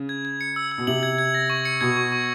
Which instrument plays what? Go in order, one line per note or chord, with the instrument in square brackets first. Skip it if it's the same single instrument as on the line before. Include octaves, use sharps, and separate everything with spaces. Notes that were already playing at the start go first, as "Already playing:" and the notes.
Already playing: [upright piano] C#3
[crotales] G#6
G#6
C#7
E6
E6
[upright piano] B2
[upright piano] C3 [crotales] F#7
[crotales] G#6
G#6
A#6
C#6
C#7
[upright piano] B2 [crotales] G#6
[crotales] C#6
C#6